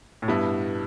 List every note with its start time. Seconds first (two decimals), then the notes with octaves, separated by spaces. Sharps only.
0.22 A2
0.28 G2 B2 G3 B3 E4